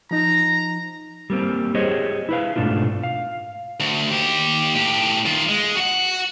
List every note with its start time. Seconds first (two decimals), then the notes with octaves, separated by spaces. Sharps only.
0.11 F3 D#4 A#5
1.30 G3 A#3 C4
1.75 G4 G#4 C5 C#5 D#5
2.29 E4 B4 F5
2.56 G#2 B2 A3 D4 F4
3.03 F5
3.80 D2
4.11 D#2 G4
4.75 A2 G4
5.26 D#3 F4
5.49 G#3
5.76 F#4 F#5